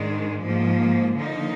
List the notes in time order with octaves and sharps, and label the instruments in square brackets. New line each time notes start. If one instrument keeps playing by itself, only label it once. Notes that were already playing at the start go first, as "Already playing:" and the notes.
Already playing: [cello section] G#2 D#3 G#3 D4
G#2 F3 A#3
D3 F3 A#3 D#4